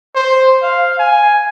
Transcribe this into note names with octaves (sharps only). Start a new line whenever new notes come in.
C5
F5
G#5